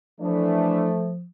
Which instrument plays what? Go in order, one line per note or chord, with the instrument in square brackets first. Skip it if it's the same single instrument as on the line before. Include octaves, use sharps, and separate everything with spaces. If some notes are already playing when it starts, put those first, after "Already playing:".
[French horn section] E3 D4 [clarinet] F3 [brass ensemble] A3